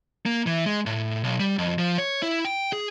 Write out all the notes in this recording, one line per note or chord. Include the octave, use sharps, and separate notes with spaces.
A#3
E3
G#3
A2
B1
G3
F2
F3
C#5
E4
G5
G#4